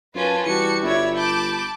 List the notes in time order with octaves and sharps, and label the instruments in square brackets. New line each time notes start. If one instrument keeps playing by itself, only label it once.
[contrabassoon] F#2 [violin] C#4 F4 [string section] B4 A5
[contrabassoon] E3 [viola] G3 F#4 [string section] A5 [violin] C#7
[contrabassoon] G1 [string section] E4 E5 [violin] C#5 D5
[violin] A5 D6 [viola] B5 [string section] G6